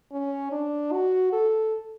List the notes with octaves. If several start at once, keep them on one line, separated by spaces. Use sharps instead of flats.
C#4
D4
F#4
A4